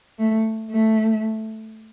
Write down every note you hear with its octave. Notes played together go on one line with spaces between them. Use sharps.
A3
A3